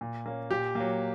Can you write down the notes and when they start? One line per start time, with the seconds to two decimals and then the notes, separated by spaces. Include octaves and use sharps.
0.01 A#2
0.26 A#3 C#4
0.51 A#2 G4
0.75 F#3 A#3